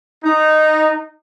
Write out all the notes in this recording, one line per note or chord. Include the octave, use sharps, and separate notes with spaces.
D#4